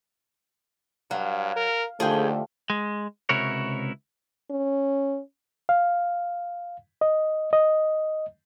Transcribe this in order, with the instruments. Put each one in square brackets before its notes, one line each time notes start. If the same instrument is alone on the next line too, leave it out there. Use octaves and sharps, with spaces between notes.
[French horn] G2 [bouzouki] F#3 [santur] F5
[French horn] A#4
[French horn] D#2 [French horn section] D3 A3 [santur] F3 G4 [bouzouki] G#4 G5
[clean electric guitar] G#3
C#2 C3 E4 F#4 A#4 C#5
[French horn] C#4
[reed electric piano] F5
D#5
D#5